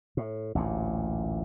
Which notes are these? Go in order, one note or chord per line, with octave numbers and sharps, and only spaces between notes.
A2
A1 D2 A#2